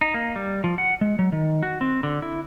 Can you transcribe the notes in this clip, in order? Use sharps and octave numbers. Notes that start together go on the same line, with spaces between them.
D#4
A#3
G3
F3
F#5
G#3
F#3
D#3
F#4
C4
D3
E4